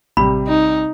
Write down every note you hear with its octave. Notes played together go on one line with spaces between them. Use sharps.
A1 C3 G3 B5
D#4